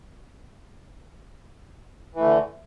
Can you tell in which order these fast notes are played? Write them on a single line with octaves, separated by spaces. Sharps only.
E3 A3 D3